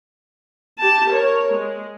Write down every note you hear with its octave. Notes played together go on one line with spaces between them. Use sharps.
G4 A5
A#4 C#5
G#3